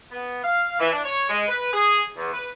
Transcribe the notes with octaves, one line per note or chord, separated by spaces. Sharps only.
B3
F5
E3
D4
C#5
G#3
B4
G#4
E2
B4